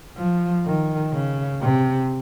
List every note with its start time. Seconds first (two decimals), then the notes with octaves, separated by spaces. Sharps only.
0.17 F3
0.66 D#3
1.13 C#3
1.61 C3